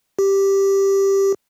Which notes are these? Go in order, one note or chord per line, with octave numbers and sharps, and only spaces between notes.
G4